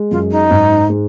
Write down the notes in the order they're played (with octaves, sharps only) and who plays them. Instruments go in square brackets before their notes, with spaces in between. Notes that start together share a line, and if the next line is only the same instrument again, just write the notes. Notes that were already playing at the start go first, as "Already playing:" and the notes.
Already playing: [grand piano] G#3
[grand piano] F#2 [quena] F4
[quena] D#4
[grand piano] G#2
G#3